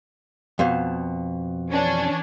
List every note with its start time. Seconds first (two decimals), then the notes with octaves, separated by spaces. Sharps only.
0.59 F2 B2
1.70 E3 C#4 D4